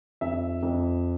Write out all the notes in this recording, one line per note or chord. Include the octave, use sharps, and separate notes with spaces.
F2 E5
F2